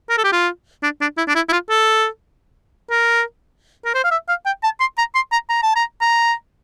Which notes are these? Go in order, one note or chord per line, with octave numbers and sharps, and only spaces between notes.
A#4
A4
G4
F4
D4
D4
E4
D4
E4
E4
F4
A4
A#4
A#4
C5
F5
E5
F5
G5
A5
C6
A#5
C6
A#5
A#5
A5
A#5
A#5